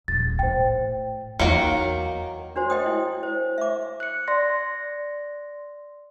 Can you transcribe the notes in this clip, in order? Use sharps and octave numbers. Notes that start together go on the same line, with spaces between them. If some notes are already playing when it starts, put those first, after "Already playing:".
D#1 A6
A2 C5 G5
E2 D#3 F#3 A#3 C#7
D4 F#4 C5
D#5 G5 D#6
E4
C5
E5 D6
F#6 C#7
D5 C6 A#6